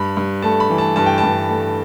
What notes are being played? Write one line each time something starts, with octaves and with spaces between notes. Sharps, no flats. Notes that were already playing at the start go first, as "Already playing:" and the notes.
Already playing: G2 B5
G2
A3 A5
B5
E3
A5
G2 A5
G5
A5
G2
A3